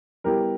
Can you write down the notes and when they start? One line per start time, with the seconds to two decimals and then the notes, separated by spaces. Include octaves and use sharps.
0.24 G3 B3 E4 G4 A#4